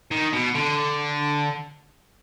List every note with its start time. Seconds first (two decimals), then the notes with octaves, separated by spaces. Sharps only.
0.11 D#3
0.33 B2
0.55 D3